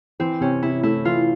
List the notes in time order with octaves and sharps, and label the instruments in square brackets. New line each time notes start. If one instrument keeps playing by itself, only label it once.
[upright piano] E3 [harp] C4
[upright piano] C3 [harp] C#4
[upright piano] C3 [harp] E4
[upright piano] A3 [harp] E4
[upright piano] E3 [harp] F4